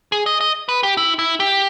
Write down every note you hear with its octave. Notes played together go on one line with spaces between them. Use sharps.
G#4
D#5
D#5
B4
G4
E4
E4
G4